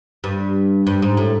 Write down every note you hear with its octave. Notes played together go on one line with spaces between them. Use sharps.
G2
G2
G#2
A2